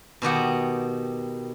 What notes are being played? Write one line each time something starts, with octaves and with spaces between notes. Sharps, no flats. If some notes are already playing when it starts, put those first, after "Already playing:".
B2 D#3 G4 F#5